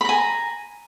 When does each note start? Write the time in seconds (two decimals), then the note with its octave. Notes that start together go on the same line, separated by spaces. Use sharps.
0.01 B5
0.05 A#5
0.09 G#5